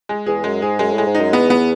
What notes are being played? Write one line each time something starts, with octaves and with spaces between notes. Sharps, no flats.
G#3
E2 G#4
F#2 G#3
G#2 G#4
F#2 G#3
A2
G#3
G#2
D#4
F#2
E2 B3
B3